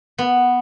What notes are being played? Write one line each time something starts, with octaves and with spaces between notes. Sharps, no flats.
B3